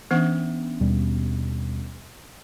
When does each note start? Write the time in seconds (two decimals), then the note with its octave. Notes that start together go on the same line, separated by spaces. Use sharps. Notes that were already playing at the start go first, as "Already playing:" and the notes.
0.11 E3 B3 C#4 D4 F#5
0.80 D#2 B2 G3